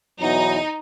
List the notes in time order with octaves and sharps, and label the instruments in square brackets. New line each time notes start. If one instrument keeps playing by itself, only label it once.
[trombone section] E2 B2 F#3 [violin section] D#4